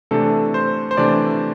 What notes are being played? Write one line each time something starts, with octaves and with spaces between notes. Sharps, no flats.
C3 E3 A3 D4 A4
C5
C5
C3 E3 A3 D4 D5